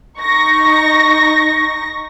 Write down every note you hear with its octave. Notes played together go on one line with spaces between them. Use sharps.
D#4 C#6 A#6